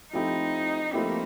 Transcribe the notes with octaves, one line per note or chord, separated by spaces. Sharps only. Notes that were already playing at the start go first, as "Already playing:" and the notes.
F3 A3 C4 D#4 E4 G4
F3 A3 A#3 C4 E4 G4